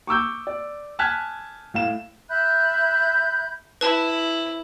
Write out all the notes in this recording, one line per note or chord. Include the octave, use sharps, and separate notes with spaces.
C#6 D6 E6 G6
D5
G#5 A5 F6 F#6 G#6 B6
A2 F5 E7
E5 B5 F#6 G6
E4 B4 A5